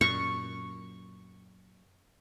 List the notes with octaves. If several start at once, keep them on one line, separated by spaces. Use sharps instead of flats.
F#2 A#2 C#6